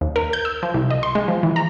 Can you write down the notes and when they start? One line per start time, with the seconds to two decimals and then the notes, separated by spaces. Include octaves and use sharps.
0.01 D#2
0.16 A#4
0.33 G6
0.45 E6
0.63 F3
0.74 C2
0.90 D#5
1.03 C6
1.15 G#3
1.28 F3
1.43 E3
1.56 A#5